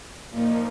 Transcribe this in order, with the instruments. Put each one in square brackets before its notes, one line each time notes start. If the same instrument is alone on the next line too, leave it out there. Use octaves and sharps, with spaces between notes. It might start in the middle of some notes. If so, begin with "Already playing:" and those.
[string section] A#2 F3 A#3 D#4